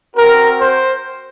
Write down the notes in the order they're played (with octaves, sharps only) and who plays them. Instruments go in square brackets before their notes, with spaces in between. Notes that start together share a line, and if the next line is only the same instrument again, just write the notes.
[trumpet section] C4 F#4 A#4
C5